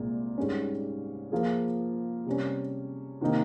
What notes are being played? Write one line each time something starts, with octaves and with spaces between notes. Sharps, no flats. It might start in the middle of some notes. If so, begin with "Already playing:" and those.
Already playing: C2 A#2 G#3
G#2 G3 C#4
F3 A#3 F4 G#4
C3 G3 C#4
C3 D#3 A#3 D#4